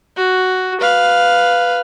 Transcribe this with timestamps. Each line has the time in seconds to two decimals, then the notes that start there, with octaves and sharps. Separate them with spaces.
0.17 F#4
0.81 B4 F5